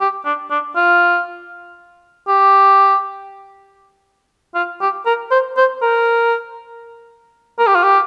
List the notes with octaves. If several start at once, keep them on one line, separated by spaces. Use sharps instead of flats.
G4
D4
D4
F4
G4
F4
G4
A#4
C5
C5
A#4
A#4
G4
F4
G4